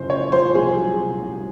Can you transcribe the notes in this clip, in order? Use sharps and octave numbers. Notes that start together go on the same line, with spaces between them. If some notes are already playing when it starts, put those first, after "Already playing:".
Already playing: F#1 C#3 F3 C5
F#2 C#5
F3 C5
C2 G#4
F#3
C3
C2